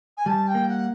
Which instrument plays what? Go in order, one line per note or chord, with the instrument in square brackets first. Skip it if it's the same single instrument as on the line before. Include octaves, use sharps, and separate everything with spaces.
[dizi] G#5
[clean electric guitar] G3 [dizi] A5
[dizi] G5
[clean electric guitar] A#3
[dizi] F#5